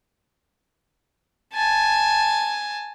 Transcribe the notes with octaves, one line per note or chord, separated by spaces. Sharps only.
G#5 A5